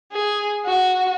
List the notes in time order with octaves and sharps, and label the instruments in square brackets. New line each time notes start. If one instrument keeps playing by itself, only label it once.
[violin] G#4
F#4